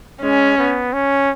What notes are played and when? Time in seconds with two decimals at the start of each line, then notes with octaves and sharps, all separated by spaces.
0.23 G#3 C#4
0.58 B3
0.94 C#4